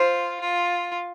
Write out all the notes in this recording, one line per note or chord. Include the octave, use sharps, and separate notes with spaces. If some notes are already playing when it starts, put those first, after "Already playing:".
Already playing: F4 C5
F4